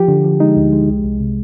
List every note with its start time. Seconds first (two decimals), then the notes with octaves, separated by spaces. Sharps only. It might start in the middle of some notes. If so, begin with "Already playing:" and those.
Already playing: F3 G4
0.08 D3
0.24 F3
0.40 G#3 D#4
0.57 D2
0.72 G#3
0.89 C2
1.04 C2
1.20 C3